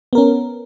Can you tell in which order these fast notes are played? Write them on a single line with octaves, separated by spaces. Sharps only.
B3 A#4 C#4